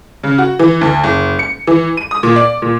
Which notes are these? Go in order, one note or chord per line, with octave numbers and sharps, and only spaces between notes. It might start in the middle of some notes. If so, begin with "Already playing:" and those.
C#3
F#4
E3
D2
F#1
C#7
E3
D#7
D#6
A#2
D5
A#2